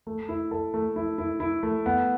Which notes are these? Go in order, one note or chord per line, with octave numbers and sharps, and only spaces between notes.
A3
E4
A4
A3
E4
E4
E4
A3
B3